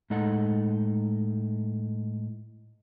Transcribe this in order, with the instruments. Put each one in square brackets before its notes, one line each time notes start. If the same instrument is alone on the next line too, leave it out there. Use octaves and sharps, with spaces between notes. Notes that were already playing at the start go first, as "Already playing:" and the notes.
[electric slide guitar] A2 G#3 D#4 A4 F#5